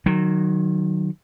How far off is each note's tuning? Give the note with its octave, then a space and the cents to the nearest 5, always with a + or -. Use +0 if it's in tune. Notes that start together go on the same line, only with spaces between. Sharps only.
D#3 -25 F#3 +0